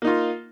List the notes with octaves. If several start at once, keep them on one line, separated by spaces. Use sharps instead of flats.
A#3 D#4 F4